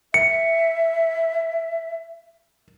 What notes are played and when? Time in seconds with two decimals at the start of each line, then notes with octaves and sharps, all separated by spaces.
0.14 E5 C#7